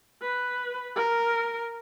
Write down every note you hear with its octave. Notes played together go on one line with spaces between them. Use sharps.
B4
A#4